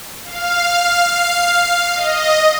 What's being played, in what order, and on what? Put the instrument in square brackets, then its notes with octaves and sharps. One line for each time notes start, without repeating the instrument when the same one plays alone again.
[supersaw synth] F5
D#5